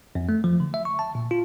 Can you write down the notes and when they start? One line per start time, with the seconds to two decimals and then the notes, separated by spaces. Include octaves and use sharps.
0.15 F2
0.29 A3
0.44 F3
0.60 D3
0.74 E5
0.85 C#6
0.99 A5
1.15 A#2
1.31 F4